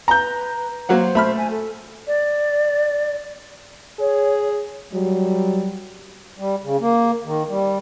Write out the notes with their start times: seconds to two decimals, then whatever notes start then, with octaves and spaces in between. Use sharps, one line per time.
0.08 B4 A#5 G6
0.89 F#3 A#3 C5 F#5
1.15 A3 B5 F6
1.38 G#5
1.51 A4
2.07 D5
3.99 G#4 C#5
4.93 F#3 G3
6.39 G3
6.63 C#3
6.80 A#3
7.24 D#3
7.49 G3